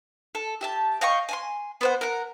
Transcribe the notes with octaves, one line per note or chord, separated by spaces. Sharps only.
A4
G4 E5 A5
D#5 F5 G5 C#6
G#5 A5 C6
B3 C5 F#5
A#4 F#5